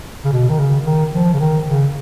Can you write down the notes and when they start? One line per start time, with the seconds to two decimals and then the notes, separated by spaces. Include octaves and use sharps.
0.24 C#3
0.32 B2
0.49 D#3
0.58 C#3
0.85 D#3
1.12 F3
1.34 C#3
1.40 D#3
1.67 C#3